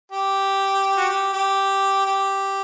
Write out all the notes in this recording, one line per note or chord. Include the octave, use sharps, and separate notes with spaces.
G4
F#4
G4
G4
G4